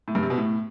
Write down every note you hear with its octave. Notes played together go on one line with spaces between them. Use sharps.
A2
G2
C3
B2
A2